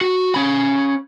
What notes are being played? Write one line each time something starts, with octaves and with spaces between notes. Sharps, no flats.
F#4
C#4 B5